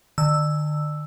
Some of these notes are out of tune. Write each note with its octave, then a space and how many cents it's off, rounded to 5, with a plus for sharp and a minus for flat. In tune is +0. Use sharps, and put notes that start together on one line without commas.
D3 +40 E6 +0